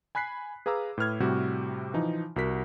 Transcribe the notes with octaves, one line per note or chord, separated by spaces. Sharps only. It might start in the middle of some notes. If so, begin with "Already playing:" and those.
G#5 B5 F#6 B6 C7
G#4 B4 F5 A#5 D6 E6
A2 B4 F6 G#6
A2 C3 G3 F#4 G4
E3 F3 D#4
C2 F#4 A#4 B6